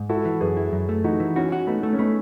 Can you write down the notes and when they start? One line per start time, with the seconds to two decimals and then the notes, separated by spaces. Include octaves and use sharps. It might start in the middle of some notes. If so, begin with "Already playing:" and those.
Already playing: G#2
0.09 E4 F#4 A4
0.25 E3
0.40 F#2 G#4 B4
0.57 E4
0.73 F#2
0.89 A3
1.04 E3 D#4 F#4
1.20 E3
1.36 C#4 E4 F#4
1.52 F#4
1.67 A3 B3 D#4
1.83 A3
1.93 C#4
1.99 A3 B3 D#4